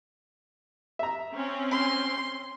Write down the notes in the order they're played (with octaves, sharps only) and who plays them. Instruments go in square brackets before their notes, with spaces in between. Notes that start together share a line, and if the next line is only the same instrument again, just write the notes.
[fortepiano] E5 A#5
[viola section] C4 C#4
[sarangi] C6